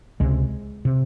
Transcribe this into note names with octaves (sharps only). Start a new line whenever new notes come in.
C#2 C3 G#3
C3